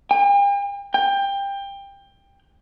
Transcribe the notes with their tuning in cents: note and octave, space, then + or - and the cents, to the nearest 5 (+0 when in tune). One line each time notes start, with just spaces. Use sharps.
G5 +45
G5 +20